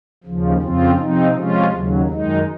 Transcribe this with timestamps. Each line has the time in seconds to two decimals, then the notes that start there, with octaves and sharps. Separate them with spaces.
0.24 D#2 C#3 F3
0.61 F2 C#3 F3 C4 F4
0.98 C3 F3 C4 D#4
1.36 C3 F3 G#3 C#4 F4
1.72 D#2 C#3 F#3
2.09 F#2 D#3 G#3 D#4